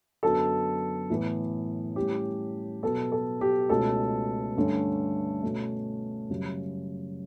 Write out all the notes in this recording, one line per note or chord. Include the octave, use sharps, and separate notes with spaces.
F#2 D3 F#3 B3 A4
A2 E3 B3
A2 G3 C#4 G4
B2 F#3 B3 A4
A4
G4
C#2 B2 A3 C#4 A4
G2 D3 A3 C#4
B2 A3 C#4
F#2 C#3 G3 C#4